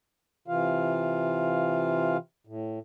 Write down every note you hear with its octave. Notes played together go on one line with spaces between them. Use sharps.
C3 E3 F4 F5
A2